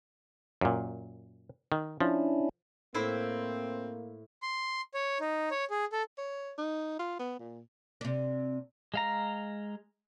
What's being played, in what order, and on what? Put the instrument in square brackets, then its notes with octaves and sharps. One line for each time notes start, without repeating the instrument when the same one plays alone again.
[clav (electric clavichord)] F#2 A#2
D#3
[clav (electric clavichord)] F3 [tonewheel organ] C#4 D4 E4
[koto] A2 E4 C5 [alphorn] A#3 [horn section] C4
[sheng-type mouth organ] C6
C#5
D#4
C#5
G#4
A4
[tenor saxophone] C#5
D#4
F4
B3
A#2
[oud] C3 D4
[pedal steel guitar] G#3 F5 A#5